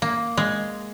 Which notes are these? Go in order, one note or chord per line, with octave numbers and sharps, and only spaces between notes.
A#3
G#3